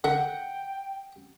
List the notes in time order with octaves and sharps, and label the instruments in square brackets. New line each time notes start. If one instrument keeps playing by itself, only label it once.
[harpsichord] D3 A#4 E5 [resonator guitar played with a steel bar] F#5 [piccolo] G5